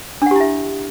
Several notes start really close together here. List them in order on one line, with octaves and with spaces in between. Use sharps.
D4 F#5 G4 E4 E5